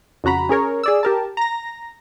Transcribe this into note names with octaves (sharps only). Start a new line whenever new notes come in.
F2 C#3 F#4 A#5 B5
C#4 G#4 A#4 C#5
G#4 D5 E6
G4 A#4 A5
A#5 A#6